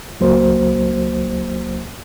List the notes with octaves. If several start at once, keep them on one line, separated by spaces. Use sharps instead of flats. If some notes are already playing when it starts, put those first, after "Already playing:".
C#2 F#3 A#3 C5